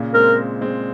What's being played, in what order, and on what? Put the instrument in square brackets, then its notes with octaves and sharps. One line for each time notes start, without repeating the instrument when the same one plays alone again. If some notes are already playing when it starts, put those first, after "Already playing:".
Already playing: [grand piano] A#2 C#3
[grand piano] G#3 C4 [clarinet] A#4
[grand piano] G#3 C4